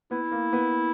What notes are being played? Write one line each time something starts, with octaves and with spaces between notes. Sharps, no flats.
B3 E4
A#3
B3